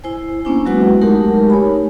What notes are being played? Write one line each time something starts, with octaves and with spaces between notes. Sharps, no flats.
E4 C5 G#5
A#3 B3 C#4 D4 E4
F#3 G#3 F#4 B4 F#5
G#3 A3 D#4 G4 A#4
C#5 G#5 B5